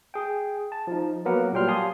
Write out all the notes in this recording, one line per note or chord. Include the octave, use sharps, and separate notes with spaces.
G#4 G5
A5
F3 D#4
F#3 A#3 B3 A#4 B4 F#5
A#2 F#3 G3 G5 C6 F6
G4 F5 G#5 A5 C6 D#6